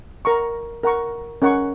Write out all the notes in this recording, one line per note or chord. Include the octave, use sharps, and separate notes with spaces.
A#4 F#5 A#5 C#6
A#4 F#5 A#5 C#6
C#4 A#4 F#5 C#6